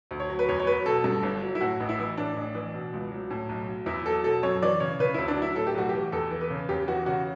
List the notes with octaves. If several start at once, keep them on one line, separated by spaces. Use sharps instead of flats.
D2
C#5
F#3
B4
E2 C#5
C#5
F#3 B4
B2 A4
G2
G1
F#3
E4
A2 F#4
A1
E4
E3
A2 D4
A1
E3
B2
C#2
F#3
A2
B1
F#3
E2 E4
F#3 A4
B2 A4
F#2 C#5
E3 D5
C#3 C#5
C#3 B4
D2 E4
D4
F#3 E4
A2 A4
G4
B1 F#4
E3 G4
E2 A4
E3
B4
C#3
E2 G4
E3 F#4
C#3 F#4